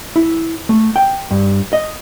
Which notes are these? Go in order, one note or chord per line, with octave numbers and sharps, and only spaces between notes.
E4
A3
G5
G2
D#5